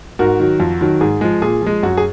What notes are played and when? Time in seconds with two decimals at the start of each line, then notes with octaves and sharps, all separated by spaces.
0.19 G#2 F#4 A#4
0.40 D#3 F#3
0.60 F2
0.81 D#3 F#3
1.01 G#2 G#4
1.21 F3 G#3
1.42 A#2 G#4
1.62 F3 G#3
1.83 F#2 F#4
1.97 G#4